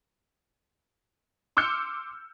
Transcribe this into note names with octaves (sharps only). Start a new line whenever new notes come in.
C6 D6 E6 F6 G6 C#7